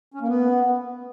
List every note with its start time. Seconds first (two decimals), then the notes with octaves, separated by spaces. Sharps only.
0.14 C#4
0.21 A#3
0.28 B3